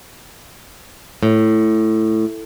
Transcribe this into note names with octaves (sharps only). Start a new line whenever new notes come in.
A2